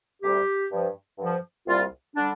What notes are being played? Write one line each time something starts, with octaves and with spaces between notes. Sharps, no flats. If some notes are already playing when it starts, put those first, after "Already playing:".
D2 C3 G3 G4
G2 F3
G2 D3 F3
C2 A#2 G3 F4
D3 G3 D4